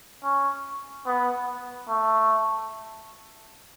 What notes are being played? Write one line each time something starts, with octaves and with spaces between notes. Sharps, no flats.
C#4
B3
A3